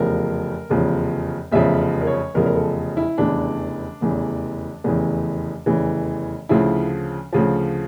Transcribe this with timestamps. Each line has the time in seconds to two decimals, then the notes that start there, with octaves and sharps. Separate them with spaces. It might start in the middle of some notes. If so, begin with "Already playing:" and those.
Already playing: F1 E2 C#3 F3 A#4
0.69 F1 E2 C#3 F3
1.52 F1 E2 C#3 F3 E5
2.01 A#4
2.07 C#5
2.34 F1 E2 C#3 F3 A#4
2.46 A#4
2.56 A4
2.97 E4
3.18 F1 E2 C#3 E3 D4
4.01 F1 E2 C#3 E3
4.84 F1 E2 C#3 E3
5.66 F1 E2 C#3 E3
6.49 D2 C#3 F3 E4
7.32 D2 C#3 F3